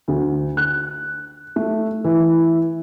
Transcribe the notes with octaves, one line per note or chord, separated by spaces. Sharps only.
D2
F#6
A3
E3